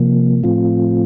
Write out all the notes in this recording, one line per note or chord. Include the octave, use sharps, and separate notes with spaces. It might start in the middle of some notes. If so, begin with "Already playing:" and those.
Already playing: C3 F3 A#3
A2 F3 A3 C4 F4